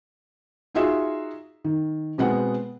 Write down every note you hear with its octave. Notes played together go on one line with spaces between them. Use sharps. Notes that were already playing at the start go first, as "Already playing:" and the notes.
D#4 F4 F#4 G#4 E5
D#3
B2 G#3 B3 C4 F#5